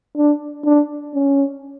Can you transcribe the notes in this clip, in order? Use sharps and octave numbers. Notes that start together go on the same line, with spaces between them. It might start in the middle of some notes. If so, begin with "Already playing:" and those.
D4
D4
C#4